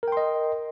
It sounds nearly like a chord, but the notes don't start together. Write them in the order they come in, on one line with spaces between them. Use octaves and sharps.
A#4 G5 C6 D#5